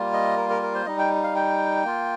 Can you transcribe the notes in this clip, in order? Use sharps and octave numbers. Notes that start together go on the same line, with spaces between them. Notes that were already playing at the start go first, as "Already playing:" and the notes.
Already playing: G3 A#3 F4
D#5
A#4
A#4
A#4
C5
G3 D#4 D#5
G5
F5
G5
A#3 F4